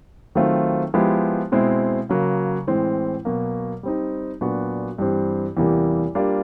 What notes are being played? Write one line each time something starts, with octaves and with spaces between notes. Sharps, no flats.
D#3 F#3 A3 C4 F4
F3 G#3 B3 E4 G4
B2 G#3 C4 E4
C#3 F#3 A#3
A2 E3 G#3 C4
B2 F#3 A#3
G3 C4 D#4
A#2 F#3 B3 D4 F#4
G2 E3 G3 C4
E2 C3 E3 G3 A#3
G3 A#3 D4 F4